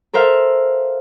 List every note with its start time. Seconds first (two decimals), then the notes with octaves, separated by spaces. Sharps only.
0.13 A4 A#4 C5 E5 F5